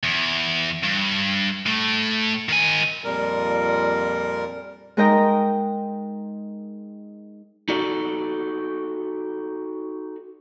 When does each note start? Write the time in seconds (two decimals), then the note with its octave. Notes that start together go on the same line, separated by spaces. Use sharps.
0.03 E2
0.84 G2
1.67 A2 A3
2.49 D#3 G#5
3.04 F2 A#2 G3 A#4
4.97 G#3 D#4 A#4 D#5 G5 A#5
7.69 D#4 F#4 A4 D5